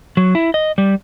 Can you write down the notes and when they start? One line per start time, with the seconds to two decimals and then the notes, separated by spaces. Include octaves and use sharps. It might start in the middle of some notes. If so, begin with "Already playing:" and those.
0.17 F#3
0.35 E4
0.54 D#5
0.78 G3